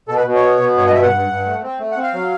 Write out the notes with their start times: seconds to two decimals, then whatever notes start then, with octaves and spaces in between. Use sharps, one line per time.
0.09 B2 A4
0.17 B4
0.26 B2
0.35 C#5
0.43 B3
0.61 B2
0.77 G2 C#5
0.86 D#5
0.94 G2 E5
1.03 F#5
1.12 G2
1.29 G2
1.46 A3
1.63 C4
1.80 A3
1.91 F#5
1.97 C4
2.03 F5
2.13 F#3